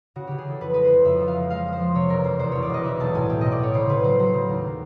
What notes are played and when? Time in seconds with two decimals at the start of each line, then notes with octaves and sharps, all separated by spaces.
0.16 C#3 F#4
0.27 C#3 G4
0.38 G#4
0.45 E3 A4
0.61 F2 B4
0.74 G#3 B4
0.84 C5
0.90 C#3
1.05 F2 E5
1.21 F3
1.28 F5
1.35 G#3
1.50 G#3 F5
1.65 G#3
1.73 C5
1.80 F3
1.95 C3 C#5
2.10 E1 A#4
2.24 E1 C5
2.39 E2 C5
2.52 E1 C#5
2.63 D5
2.70 E1 D#5
2.84 E3 E5
3.00 B1 A5
3.15 A2 G#5
3.29 B1 G5
3.41 A2 D#5
3.52 D5
3.59 B1 C#5
3.74 C#3 C5
3.89 C#3 B4
4.04 F#3 C5
4.19 F#3 C5
4.34 C#3
4.49 D#2